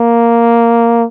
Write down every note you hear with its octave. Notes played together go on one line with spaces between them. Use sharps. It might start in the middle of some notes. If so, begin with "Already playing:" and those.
Already playing: A#3